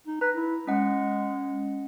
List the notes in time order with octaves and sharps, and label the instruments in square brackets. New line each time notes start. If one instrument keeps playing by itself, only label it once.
[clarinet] D#4
[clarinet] B4 [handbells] A#5
[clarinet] E4
[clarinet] G#3 [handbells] C#4 D#5 F#5